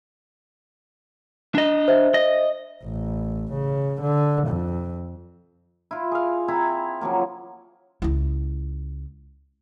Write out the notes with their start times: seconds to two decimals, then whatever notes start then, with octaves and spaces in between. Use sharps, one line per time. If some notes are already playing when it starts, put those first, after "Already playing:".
1.55 D4 D#5
1.88 C5 E5
2.14 D#5
2.84 A1
3.52 C#3
4.01 D3
4.47 F2
5.91 E4 F4
6.11 G#4 F5
6.48 C4 E4 A#5 B5
7.01 C#3 F3 F#3 A#3
8.02 C#2 E4